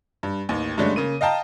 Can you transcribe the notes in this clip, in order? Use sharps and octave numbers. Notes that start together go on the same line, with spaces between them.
G2
A1 D#2
G2 D3 G#3 A3 C#4 D4
C#3 A#3 D#7
D#5 F5 G5 A5 A#5